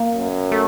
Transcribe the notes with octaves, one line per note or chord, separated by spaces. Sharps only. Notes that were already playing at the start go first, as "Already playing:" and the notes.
Already playing: A#3
F#2
A3